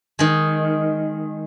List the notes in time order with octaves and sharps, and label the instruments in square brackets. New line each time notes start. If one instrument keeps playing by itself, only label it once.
[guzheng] D#3 G#3